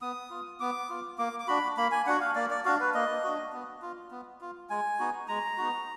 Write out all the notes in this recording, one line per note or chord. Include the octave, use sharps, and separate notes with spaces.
B3 D#6
F4
B3 D6
F4
A#3 D6
D6
D4 F#4 B5
A#3 B5
G#5
D4 F#4 F#5
F5
A#3 D5
D5
D4 F#4 F5
B4
A#3 D#5
D4 F#4
B3
F4
B3
F4
G#3 G#5
B3 D#4 F#4
G#3 A#5
B3 D#4 F#4